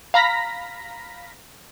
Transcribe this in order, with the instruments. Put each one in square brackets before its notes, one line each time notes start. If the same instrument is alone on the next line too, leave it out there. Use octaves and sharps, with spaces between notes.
[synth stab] F5 A#5 B5 A#6 B6